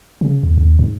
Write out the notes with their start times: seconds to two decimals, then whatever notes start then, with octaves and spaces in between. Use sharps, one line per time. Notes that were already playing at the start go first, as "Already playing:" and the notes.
0.21 C#3
0.43 D#2
0.58 D#2
0.79 G#2